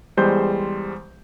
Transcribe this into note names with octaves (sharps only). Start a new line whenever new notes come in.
E2 G3 G#3 C5 C6 G6